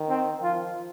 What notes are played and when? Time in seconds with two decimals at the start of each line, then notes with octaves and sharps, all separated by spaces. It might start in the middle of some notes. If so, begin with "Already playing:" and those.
Already playing: D#3
0.09 C4
0.42 F3 F4